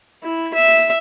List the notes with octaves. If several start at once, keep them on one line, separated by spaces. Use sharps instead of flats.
E4
E5